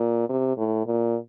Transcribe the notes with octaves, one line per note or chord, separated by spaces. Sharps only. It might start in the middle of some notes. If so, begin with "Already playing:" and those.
Already playing: A#2
C3
A2
A#2